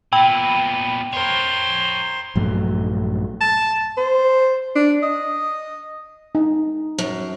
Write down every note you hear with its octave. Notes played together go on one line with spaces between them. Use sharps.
A#2 B3 G5 B5
A#4 C5 C#5
A#1 G2 F#3 A3
A5
C5
D4
D#5
D#4
F#2